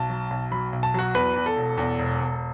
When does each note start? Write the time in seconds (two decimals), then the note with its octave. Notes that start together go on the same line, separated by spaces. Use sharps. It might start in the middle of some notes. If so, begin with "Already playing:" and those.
Already playing: B1 A5
0.09 F#3
0.30 B1
0.51 F#3 B5
0.73 B1
0.83 A5
0.94 F#3 F#4
1.14 E2 B4
1.36 E2
1.46 A4
1.56 E1
1.78 E2
1.99 E1
2.20 E1